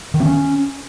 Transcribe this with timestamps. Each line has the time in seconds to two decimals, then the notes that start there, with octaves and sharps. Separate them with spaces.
0.14 D#3
0.20 C4
0.26 C#4